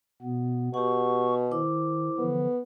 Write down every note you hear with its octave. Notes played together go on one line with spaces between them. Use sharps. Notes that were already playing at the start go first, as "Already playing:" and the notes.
B2 B3
B2 G4 F#5 C#6
D#3 E4 C5 D6
D3 E3 F3 B3